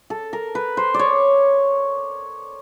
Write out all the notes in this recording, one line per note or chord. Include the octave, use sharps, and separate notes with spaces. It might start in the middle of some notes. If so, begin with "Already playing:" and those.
A4
A#4
B4
C5
D5
C#5